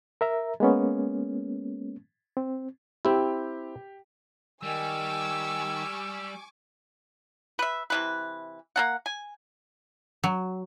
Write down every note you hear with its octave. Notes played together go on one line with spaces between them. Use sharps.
A#4 E5 A#5
G#3 A#3 B3 C#4
C4
C4 E4 G4
D#3 G3 G#5 C#6 D6 E6
B4 E5
C3 E3 B4
A#3 D4 F#5
G#5
F#3